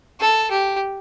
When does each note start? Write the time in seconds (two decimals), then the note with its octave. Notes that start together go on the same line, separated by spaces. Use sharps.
0.20 A4
0.51 G4